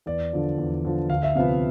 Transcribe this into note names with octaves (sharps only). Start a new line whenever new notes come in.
E2 D5
D3 F3
E2
D3 F3
D2 F5
E5
C3 F3 B3 F5